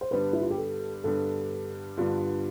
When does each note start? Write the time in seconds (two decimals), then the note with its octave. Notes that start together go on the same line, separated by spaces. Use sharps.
0.01 C5
0.11 G2 D3 G3 B3 B4
0.33 E4
0.41 F4
0.50 G4
0.58 A4
1.04 G2 D3 G3 B3 A4
1.97 G2 D3 G3 B3 F4